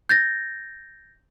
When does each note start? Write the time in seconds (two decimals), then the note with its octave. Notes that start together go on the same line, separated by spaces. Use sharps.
0.09 G6 A6 A#6